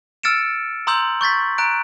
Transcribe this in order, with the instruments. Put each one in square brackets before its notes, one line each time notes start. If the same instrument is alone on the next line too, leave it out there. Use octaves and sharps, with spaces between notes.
[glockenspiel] E6 F6 A6 C#7 D7 E7
A#5 C6 D#6 E6 G6 F#7
C#6 G6 A6 B6
A#5 F#6 D7